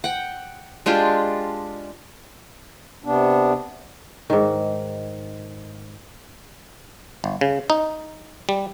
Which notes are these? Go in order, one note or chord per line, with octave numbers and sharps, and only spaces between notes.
F#5 G5
G#3 D4 F4 G4
C3 B3 D4
G#2 D#3
G1
C#3
D#4
G3